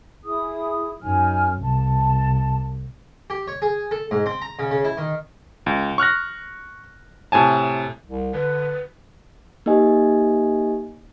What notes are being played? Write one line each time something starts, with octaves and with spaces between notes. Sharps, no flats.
E4 G#4 D#6
F#2 D#4 G#5 F6
C2 A5
G4
C#5
G#4
A4
G#2
C4
A#5
C#3
C#3
E4
D#3
C#2
C#6 F6 F#6 A#6
A2 C3 G#5 A5
C2
D3 B4
A#3 D#4 G4 D#5 G#5